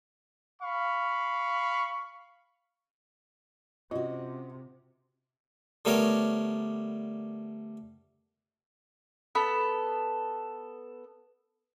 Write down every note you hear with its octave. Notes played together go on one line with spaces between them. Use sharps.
F5 B5 C#6
C3 C#4 F4 F#4 D#5
D3 G3 A3 B3 A#4 C#5
B3 A4 B5